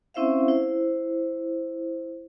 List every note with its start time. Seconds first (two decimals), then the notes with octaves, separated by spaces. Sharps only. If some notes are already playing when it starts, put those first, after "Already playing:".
0.14 C4 C#4 E4 C5 E5 F5
0.48 E4 C5